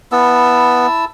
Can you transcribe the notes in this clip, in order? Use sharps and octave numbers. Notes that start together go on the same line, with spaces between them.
B3 E4 A5 E6